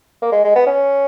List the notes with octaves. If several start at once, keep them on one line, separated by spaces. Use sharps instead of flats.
A#3
G#3
G#3
B3
C#4